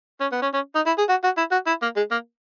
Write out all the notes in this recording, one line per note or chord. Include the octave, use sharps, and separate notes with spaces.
C#4
B3
C#4
C#4
D#4
E4
G#4
F#4
F#4
E4
F#4
E4
A#3
G#3
A#3